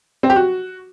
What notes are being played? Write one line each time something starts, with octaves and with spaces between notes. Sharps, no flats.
C4
G4
F#4